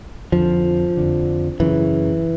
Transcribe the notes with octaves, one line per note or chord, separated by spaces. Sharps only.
F2 D3 F3
F2 D3
F#2 C#3 E3